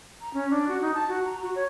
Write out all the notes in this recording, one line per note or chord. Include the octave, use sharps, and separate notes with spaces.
A#5
C#4
D4
F#4
D#4
A5
F#4
A#5
F#4
C#5